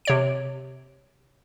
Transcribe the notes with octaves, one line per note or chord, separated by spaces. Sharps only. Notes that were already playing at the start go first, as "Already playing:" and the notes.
C3 C#5 D7